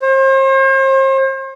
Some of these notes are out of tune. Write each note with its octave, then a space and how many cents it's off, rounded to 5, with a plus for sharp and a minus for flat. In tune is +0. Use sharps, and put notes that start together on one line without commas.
C5 +40